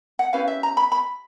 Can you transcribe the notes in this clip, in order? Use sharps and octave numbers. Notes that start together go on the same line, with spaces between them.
F#5
C#4 E4 G4 B4 F5
E5
A#5
B5
B5